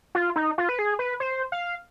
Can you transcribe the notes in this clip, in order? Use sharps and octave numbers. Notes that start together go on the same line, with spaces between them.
F4
D#4
F4
B4
G#4
B4
C5
F5